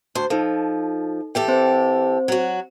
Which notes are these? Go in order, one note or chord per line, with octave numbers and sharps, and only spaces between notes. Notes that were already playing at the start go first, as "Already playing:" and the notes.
D2 C5
F3 D#4 A4
E3 G4 A4 G5
C4 C5
F#3 F#4